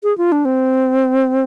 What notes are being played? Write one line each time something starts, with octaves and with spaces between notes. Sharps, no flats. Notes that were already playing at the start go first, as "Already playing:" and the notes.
G#4
F4
D4
C4